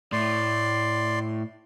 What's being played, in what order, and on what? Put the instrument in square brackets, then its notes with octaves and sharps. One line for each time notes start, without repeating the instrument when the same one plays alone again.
[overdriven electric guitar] A2 [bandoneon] D5 C6